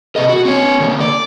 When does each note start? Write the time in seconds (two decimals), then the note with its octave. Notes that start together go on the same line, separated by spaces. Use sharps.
0.16 C3 D#5
0.29 F#4
0.45 C4 C#5
0.80 D3 A#3
1.00 D5